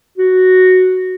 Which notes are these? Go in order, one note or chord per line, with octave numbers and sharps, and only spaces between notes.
F#4